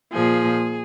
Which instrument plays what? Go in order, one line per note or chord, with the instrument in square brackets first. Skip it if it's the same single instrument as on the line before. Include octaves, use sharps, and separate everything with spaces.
[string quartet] A#2 F3 G#4